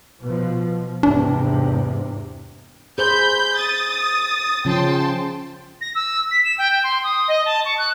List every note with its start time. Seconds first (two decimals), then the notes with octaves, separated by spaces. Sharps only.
0.24 B2 F3
1.03 E2 G#2 C3 D4
2.98 G#4 C5 B5 G6
3.56 D#6 A6
4.65 C#3 F3 C#4 G5 A5 C6
5.81 A#6
5.95 E6
6.31 B6
6.44 E7
6.58 G5
6.71 G5
6.83 C6
7.04 D#6
7.28 D#5
7.45 A5
7.65 C#6
7.77 F#6